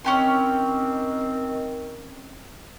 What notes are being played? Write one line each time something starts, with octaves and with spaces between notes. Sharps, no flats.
D#3 C4 C#4 G4 C6